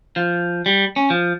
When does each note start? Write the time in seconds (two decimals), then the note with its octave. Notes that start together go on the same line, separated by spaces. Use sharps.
0.16 F3
0.66 G3
0.96 C#4
1.10 F3